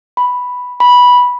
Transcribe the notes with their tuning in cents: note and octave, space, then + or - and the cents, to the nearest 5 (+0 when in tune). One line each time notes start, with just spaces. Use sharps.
B5 +0
B5 -10